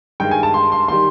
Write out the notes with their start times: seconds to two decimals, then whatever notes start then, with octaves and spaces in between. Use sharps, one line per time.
0.20 G2 D#3 G#3 G5
0.31 G#5
0.43 A5
0.54 C6
0.72 C6
0.88 D#3 G3 C6